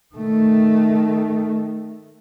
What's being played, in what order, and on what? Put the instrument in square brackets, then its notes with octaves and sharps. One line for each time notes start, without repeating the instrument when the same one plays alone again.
[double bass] D#3 A3